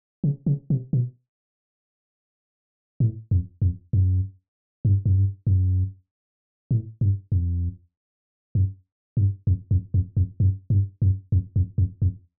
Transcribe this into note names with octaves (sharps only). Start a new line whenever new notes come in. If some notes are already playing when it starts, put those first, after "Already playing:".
C#3
C#3
C3
B2
A2
F2
F2
F#2
G2
F#2
G2
F#2
A2
G2
F2
F#2
G2
F2
F2
F2
F2
F#2
G2
F#2
F2
F2
F2
F2